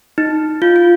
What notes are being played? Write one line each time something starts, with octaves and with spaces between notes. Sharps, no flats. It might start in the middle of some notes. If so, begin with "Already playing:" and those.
D#4
F4
F4